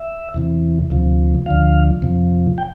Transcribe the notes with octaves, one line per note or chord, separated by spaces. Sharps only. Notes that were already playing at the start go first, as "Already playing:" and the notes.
Already playing: E5
E2 C3 E3
D2 C3 F3
D2 D3 F3 F5
F2 C3 F3
G5